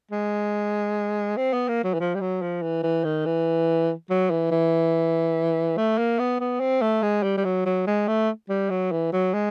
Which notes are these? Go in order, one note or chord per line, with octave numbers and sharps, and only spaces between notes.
G#3
C4
B3
A#3
F#3
E3
F3
G3
F#3
F3
E3
E3
D#3
E3
F#3
E3
E3
A3
A#3
B3
B3
C4
A3
G#3
G3
G3
F#3
F#3
G#3
A3
G3
F#3
E3
F#3
G#3